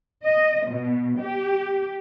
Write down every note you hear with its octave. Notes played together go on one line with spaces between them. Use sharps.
D#5
B2
G4